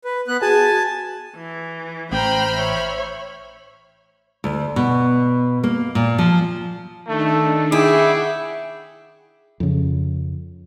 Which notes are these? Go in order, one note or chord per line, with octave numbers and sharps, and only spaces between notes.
B4
B3 F#6
F#4 G#4 G#5 A5
E3
A1 C5 G5 A#5 B5 F6
C#5 E5
D2
B2
A#3
A#2
F3
D#3 A3 D4 D#4
E4 G#4 F#5 G5 C#6 D6
F2 C#3